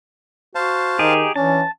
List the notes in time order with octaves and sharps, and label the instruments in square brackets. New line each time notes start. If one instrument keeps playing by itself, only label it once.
[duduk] F#4 [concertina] C5 F5 A5
[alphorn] D#3 [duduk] D#4 [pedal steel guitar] G4 G#4
[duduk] E3 [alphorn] C#4 [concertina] D4 [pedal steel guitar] A5